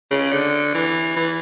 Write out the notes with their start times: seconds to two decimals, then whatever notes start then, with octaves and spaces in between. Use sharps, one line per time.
0.11 C#3
0.32 D3
0.75 E3
1.17 E3